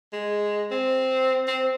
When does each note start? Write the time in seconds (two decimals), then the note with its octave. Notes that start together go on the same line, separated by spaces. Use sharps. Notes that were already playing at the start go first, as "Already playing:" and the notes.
0.13 G#3
0.71 C4
1.48 C4